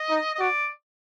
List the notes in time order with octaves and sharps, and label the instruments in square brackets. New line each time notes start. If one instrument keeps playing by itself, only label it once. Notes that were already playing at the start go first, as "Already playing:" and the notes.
Already playing: [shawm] D#5
[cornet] D#4
[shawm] D#5
[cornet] F#4 [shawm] D5